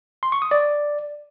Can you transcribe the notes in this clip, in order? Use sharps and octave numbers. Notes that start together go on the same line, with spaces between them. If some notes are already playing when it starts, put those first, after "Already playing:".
C6
C#6
D#6
D5